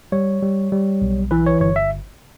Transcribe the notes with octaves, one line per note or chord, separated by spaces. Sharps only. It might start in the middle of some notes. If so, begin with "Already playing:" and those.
G3 C#5
G3
G3
B1
E3 B4
C#5
G1 C#5
E5